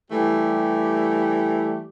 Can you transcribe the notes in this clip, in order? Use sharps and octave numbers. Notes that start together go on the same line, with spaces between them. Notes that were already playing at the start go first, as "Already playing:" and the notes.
E3 G3 A3 G4